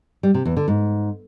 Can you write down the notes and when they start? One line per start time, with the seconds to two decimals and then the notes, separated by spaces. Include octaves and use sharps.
0.23 G3
0.34 C3
0.45 E2
0.57 D3
0.68 G#2